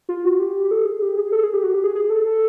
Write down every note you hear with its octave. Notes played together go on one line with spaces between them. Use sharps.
F4
F#4
G4
A4
G#4
G4
G#4
A4
G#4
G4
F#4
G4
G#4
G#4
A4
A4